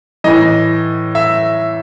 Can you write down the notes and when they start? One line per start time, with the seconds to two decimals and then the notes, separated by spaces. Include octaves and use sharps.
0.24 A2 E3 D#5
1.15 E5